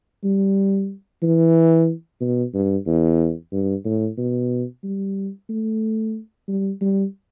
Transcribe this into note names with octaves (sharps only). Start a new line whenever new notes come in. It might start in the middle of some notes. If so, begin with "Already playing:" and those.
G3
E3
B2
G2
E2
G2
A2
B2
G3
A3
G3
G3